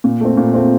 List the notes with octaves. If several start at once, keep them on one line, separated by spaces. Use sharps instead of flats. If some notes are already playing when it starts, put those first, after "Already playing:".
A#2
A3 C4
A#2
A3 C4